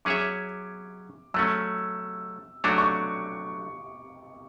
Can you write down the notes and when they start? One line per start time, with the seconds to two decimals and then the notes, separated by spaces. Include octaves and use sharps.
0.05 F#3 C#4 G#4 C#5 E5 D6
1.34 F#3 A3 C#4 E6
2.64 F#3 A3 D4 F#4 C#5 D6
2.78 C#6